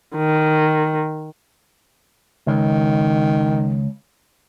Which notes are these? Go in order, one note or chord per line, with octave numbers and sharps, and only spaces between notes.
D#3
C#2 D#3